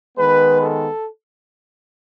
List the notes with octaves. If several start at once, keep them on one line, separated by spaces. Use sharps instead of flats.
D#3 G#3 B3 B4
A4